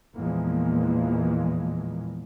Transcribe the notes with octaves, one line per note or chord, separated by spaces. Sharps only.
E2 A#2 E3 F3 G#3 A#3